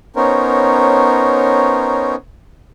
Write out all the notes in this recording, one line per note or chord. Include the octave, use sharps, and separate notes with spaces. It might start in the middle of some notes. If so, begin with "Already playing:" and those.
B3 C#4 D#4 A#4 C5 C#5